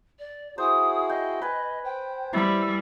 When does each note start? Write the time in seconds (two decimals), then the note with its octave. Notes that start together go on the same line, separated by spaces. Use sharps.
0.19 D5
0.58 E4 F#4 G#4 C5 D#6
1.09 D#5 G5
1.42 B4 G#5
1.84 C5 G5
2.33 G3 E4 B5 E6